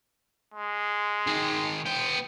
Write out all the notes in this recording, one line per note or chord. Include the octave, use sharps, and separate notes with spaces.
G#3
D#3 G#4
B3 G5